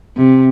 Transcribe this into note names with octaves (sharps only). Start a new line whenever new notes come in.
C3